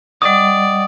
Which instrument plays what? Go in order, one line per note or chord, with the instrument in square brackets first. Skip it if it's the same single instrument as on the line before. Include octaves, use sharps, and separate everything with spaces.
[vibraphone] G3 D#5 F#5 [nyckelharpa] D5 [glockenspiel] D#6